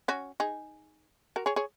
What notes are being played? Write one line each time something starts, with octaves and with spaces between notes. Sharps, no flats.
C#4 F#4
D#4 G#4
F#4 A#4
G#4 C#5
G#4 C#5